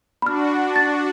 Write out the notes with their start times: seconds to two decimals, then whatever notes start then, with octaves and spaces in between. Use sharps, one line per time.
0.22 D4 F#4 B5 F6
0.76 A6